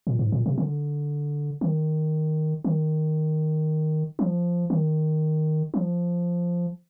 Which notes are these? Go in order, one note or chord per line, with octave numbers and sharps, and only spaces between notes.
A#2
G#2
A#2
C3
D3
D#3
D#3
F3
D#3
F3